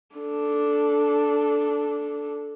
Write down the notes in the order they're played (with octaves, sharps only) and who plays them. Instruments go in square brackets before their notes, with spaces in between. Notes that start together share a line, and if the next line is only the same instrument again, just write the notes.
[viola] D4 A4